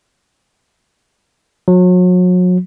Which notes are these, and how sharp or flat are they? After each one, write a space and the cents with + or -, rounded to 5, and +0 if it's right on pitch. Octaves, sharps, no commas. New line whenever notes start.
F#3 -35